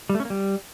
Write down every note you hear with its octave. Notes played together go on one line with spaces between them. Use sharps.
G3
A3
C#4
A#3
G3